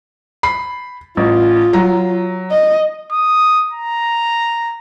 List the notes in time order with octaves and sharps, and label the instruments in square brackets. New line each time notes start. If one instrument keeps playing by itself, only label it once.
[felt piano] B5 C7
[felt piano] A1 [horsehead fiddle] F4
[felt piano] F#3 A#5
[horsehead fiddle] D#5
[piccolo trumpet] D#6
A#5